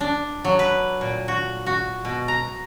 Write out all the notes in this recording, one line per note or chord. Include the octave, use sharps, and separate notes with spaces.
D4
F#3
B4
A#2
F#4
F#4
B2
A#5